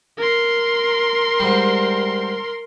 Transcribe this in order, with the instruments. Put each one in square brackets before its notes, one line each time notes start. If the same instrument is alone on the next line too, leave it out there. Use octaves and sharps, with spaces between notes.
[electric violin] A#4 C6
[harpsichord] G#2 G3